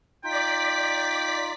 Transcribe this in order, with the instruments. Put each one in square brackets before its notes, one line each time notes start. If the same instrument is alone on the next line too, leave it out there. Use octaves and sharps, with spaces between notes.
[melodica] D#4 F4 [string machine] D5 B6 [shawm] G5